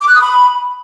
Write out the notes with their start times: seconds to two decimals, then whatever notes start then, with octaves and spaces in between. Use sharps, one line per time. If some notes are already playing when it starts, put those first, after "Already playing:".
0.01 D6
0.08 F#6
0.15 D#6
0.22 B5